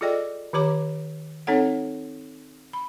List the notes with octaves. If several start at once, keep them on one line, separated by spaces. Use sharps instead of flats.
F4 G#4 A4 D5 D#5 G5
D#3 G4 C#5 A#5 D6
C4 D#4 A4 C#5 F#5
B5